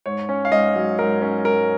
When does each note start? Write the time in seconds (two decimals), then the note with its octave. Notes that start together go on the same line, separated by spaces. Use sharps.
0.06 G#2 C#5
0.29 C#4
0.45 F5
0.52 G#2 D#5
0.76 F#3
0.99 G#2 A#4
1.22 C#4
1.45 G#2 A#4